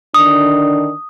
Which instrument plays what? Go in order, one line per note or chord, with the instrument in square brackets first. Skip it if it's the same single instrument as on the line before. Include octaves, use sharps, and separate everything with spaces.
[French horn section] D3 D#3 D4 [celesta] D#6